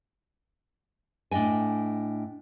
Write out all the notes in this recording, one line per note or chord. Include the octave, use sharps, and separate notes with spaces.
A2 D4 D#5 G5 G#5